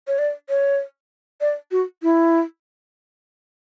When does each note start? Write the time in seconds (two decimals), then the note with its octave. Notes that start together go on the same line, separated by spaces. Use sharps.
0.07 C#5
0.19 D5
0.49 C#5
1.41 D5
1.71 F#4
2.03 E4